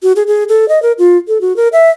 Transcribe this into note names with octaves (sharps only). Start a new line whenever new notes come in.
F#4
G#4
G#4
A4
D#5
A#4
F4
A4
F#4
A#4
E5